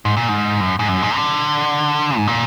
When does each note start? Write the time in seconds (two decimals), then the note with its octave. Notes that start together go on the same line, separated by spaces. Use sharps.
0.05 G#2
0.17 A#2
0.29 G#2
0.60 F#2
0.79 G#2
0.88 F#2
1.02 G#2
1.16 D3
2.17 G#2
2.27 A#2